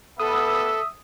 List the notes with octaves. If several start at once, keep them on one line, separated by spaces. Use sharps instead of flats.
G3 B3 A4 E5 D#6